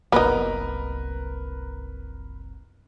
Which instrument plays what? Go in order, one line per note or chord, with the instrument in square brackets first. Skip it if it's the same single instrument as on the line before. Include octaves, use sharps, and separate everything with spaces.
[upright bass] F#1 C2 [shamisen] B3 D#4 [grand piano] A#4 B4 A#5